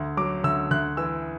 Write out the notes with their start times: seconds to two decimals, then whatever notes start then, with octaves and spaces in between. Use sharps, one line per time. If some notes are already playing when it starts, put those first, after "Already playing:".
Already playing: D2
0.17 F#3 D6
0.44 D2 E6
0.71 D2 F#6
0.97 E3 E6